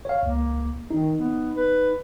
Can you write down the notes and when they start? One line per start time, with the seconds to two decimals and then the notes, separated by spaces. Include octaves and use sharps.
0.05 C#5 F5
0.23 C#2 A#3
0.91 D#3 D#4
1.19 B3
1.56 B4